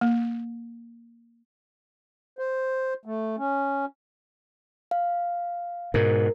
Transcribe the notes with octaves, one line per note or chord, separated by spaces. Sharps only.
A#3
C5
A3
C#4
F5
G#2 B2 A#4